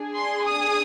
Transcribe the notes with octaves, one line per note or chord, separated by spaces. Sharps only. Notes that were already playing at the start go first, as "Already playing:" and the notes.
Already playing: D4 G#4
C6
D#6